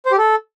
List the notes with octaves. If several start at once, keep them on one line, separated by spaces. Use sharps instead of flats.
C5
G4
A4